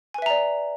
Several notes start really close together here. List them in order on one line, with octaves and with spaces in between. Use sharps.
G#5 B4 E5 A#5 D5